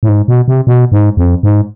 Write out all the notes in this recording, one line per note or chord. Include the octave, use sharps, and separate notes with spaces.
A2
G#2
B2
C3
B2
G#2
F2
G#2